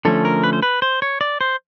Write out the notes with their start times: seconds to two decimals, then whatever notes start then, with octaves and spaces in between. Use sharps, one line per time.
0.05 D3 F3 A3 C#4 A4
0.25 A#4
0.44 B4
0.53 C5
0.63 B4
0.82 C5
1.02 C#5
1.21 D5
1.41 C5